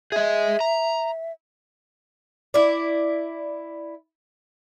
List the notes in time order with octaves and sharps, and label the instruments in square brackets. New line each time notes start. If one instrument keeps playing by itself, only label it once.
[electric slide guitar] G#4 D#5 [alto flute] E5
[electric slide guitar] A#5
[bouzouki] E4 D5